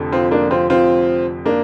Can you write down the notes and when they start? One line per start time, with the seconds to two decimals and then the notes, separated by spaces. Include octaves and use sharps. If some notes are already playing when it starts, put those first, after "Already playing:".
Already playing: F1 F2 D3
0.12 C4 F4
0.31 A#3 D4
0.51 C4 F4
0.70 C4 F4
1.45 A#3 D4